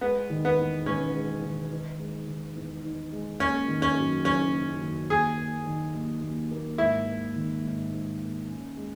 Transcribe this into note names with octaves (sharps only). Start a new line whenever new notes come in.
G#3 B3
D#3
B3
E2
E1 C#4
G#3
D#3
D#4
G#3
D#3
E2
D#4
G#3
A#3 C#4
D#3
C#4
F#2
F#1 C#4
A#3
D#3
D#2 G#4
A#3
D#3
D#2
D#2
A#3
G#2 E4
A#3
D#3
G#2
G#2
A#3
C#4
G#3